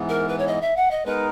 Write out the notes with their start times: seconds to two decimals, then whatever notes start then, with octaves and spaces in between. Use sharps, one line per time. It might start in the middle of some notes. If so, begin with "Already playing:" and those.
Already playing: G#2 E3 B3
0.09 A#4
0.28 B4
0.38 C#5
0.47 D#5
0.62 E5
0.76 F#5
0.91 D#5
1.05 G#3 B3 D#4 A#4 B4